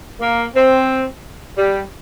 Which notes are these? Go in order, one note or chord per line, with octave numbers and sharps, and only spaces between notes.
A#3
C4
G3